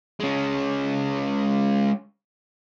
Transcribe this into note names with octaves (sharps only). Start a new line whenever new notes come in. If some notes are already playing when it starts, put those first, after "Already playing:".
G#3 C#4